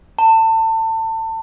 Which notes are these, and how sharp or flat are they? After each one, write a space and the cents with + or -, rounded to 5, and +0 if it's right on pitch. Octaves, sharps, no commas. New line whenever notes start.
A5 +30